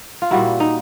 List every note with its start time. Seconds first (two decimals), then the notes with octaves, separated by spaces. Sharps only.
0.22 F4
0.31 A#2 G3 A#3 E4 F#4
0.60 D#4